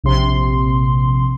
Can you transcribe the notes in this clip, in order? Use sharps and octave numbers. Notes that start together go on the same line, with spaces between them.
A#1 C3 C6